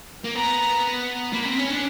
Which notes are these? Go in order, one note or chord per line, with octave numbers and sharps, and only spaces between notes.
A#3
B3 A#5
A#3 B5
C4
C#4
D4